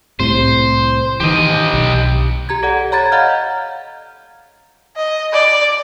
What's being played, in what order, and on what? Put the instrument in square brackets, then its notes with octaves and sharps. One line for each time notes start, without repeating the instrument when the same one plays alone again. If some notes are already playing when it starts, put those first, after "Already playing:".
[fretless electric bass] C2 A2 C3 [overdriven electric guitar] C5
[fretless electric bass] D#3 E3 [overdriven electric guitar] G4 D#5
[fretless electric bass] B1
[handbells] G4 A#5 G#6
A4 D5 F#5
C#5 A#5 B5 G#6 A6
D#5 F5 F#5 A#5 F6 G6
[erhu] D#5
D5